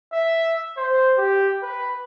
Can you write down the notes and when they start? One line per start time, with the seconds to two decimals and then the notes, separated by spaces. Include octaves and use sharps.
0.13 E5
0.77 C5
1.18 G4
1.62 B4